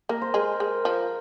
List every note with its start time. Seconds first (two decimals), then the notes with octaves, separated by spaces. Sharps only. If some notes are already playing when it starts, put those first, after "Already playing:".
0.09 A#3 A#4
0.21 C5
0.34 G#3 A#4
0.60 G#3
0.85 F3